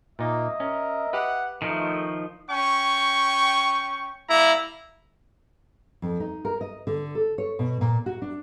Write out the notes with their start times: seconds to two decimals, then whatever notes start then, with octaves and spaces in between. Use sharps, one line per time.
0.19 A#2 A#3 D#4 D#5 E5
0.60 C#4 A#4
1.13 G4 B4 F#5
1.62 D#3 F3 A3 D#4
2.50 C#4 G5 C#6
4.29 G3 A#3 E4 A#5
6.02 F2
6.20 D#4
6.45 A#4
6.61 D#5
6.87 D3
7.15 A4
7.38 C#5
7.59 B2
7.81 A#2
8.06 F#4
8.22 D4